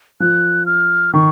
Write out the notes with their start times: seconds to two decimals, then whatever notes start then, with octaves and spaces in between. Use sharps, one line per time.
0.20 F3 F#6
0.66 F6
1.14 D#3 C#6